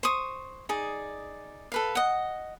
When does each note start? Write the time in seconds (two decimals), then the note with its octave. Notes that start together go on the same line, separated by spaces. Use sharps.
0.03 C5 C#6 D#6
0.69 D#4 G#4 D5
1.72 A4 B4 F5
1.95 D#5 F#5